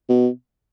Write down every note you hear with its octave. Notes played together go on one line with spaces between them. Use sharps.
B2